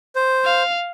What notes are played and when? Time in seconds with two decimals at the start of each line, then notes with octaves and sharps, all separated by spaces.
0.16 C5
0.45 F5